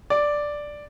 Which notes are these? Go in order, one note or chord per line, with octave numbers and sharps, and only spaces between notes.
D5